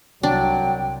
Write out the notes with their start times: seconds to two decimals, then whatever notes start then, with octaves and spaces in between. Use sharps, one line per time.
0.23 C2 F#3 D4 G5